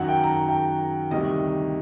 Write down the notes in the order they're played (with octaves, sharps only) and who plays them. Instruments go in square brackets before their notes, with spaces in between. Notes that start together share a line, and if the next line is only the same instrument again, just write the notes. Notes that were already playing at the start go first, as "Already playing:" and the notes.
Already playing: [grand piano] F#2 D#3 F#3 F#5
G5
A#5
A5
G5
D2 C3 D#3 G3 D#5